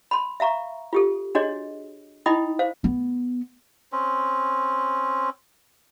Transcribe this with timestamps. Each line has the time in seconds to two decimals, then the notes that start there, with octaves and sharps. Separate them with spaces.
0.11 B5 C6
0.40 E5 F5 A#5 C#6
0.93 F4 G4 A4
1.35 D4 F#4 G#4 C#5 D#5
2.26 D#4 E4 D#5 G5 B5 D#6
2.59 C5 F5
2.84 B3
3.92 C4 C#4